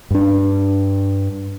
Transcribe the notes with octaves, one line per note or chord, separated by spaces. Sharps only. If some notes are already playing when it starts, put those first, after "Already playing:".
G2 D4